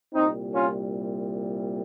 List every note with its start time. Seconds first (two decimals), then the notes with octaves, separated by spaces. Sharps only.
0.14 C2 A#2 G3 C4 D#4
0.55 C#4 F4